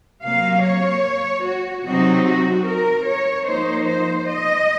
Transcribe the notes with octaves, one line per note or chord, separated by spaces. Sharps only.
C3 F#3 A#3 F5
C#5
F#4
C3 F#3 C4 D#4 F#4
F#4
A#4
C#5
F3 A#3 D#4 C5
C5
D#5